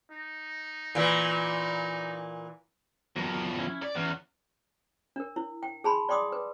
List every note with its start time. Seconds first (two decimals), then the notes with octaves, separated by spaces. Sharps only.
0.11 D#4
0.95 A#2 E3
3.16 E2 F3 F#3 A#4
3.59 C#4 E4
3.83 D5
3.95 E2 B3 C#4
5.16 D4 A#4
5.36 E4
5.63 G5
5.84 G#4 G#5 A5 B5 C6
6.09 D5 G5 C6 D6 D#6
6.32 B4